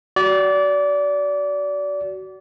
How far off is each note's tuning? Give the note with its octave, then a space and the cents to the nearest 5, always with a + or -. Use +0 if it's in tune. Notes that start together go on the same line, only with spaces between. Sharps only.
F#4 +25 D5 -25